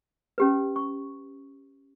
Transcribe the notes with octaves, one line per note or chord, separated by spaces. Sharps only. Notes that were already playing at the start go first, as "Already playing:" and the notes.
C#4 G4 B4
C#6